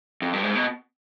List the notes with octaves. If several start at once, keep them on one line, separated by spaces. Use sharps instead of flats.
F2
G2
G#2
B2